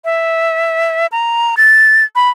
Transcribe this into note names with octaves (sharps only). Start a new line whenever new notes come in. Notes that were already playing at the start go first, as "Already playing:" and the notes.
E5
A#5
A6
B5